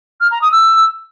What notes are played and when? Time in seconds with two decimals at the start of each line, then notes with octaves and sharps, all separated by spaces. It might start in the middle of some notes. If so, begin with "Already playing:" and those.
0.21 F6
0.31 A#5
0.42 D#6
0.52 E6